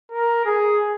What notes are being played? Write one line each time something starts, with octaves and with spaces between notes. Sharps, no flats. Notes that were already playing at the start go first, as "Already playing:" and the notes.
A#4
G#4